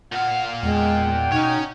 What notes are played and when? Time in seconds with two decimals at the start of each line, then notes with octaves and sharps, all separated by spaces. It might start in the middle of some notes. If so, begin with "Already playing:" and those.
0.12 A#2 F5 F#5
0.63 E2 G#3 F#5 G5
1.32 B2 C#4 D#4 C#5